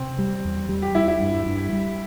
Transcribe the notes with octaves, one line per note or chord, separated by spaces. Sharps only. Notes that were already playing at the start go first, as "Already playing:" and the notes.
Already playing: C3 C4
G3
E2
G3
G4
G3 E4
E4
G2
G2
G3